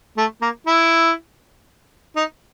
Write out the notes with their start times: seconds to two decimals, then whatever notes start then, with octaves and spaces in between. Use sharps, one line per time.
0.18 A3
0.42 A#3
0.67 E4
2.16 D#4